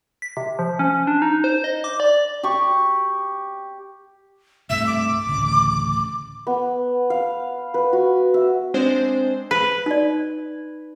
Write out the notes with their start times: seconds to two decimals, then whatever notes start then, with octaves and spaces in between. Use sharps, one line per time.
0.22 B6
0.37 C3
0.59 F3
0.79 C#4
1.07 D4
1.22 D#4
1.44 C5
1.64 D#5
1.84 D6
2.00 D5
2.43 G4 C#6
4.70 C2 G2 A3 E5
4.87 D6
5.27 A1 D2 C#3
6.47 B3
7.10 F5
7.74 B4
7.93 F#4
8.34 E5
8.74 G#3 C4 D4 C5
9.51 B4
9.86 D#4 D5